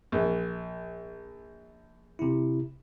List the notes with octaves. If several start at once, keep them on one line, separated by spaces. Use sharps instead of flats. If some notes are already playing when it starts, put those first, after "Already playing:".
A#1
C3 E4